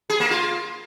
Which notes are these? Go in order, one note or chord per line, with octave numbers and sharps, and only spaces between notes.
G#4
A#3
F4